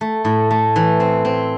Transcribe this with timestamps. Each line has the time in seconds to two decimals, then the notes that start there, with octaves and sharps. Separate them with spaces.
0.01 A3
0.25 A2
0.51 A3
0.76 E3
1.00 C4
1.25 C4